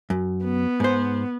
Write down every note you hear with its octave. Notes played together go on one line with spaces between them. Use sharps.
F#2
B3
G#2 C5